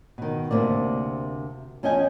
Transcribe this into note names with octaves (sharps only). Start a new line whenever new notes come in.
B2 D#3
D2 G#2 C3 A#3 D5
E2 C#4 A4 D#5 G5 G#5